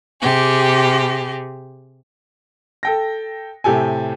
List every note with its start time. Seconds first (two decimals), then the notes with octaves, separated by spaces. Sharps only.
0.21 C3 G4 G#4
2.83 A4 G5 A#6
3.64 A2 C3 G4 A4 G#5